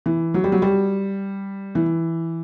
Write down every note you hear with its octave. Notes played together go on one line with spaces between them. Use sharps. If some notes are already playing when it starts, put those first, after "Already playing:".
E3
F#3
G3
F#3
G3
E3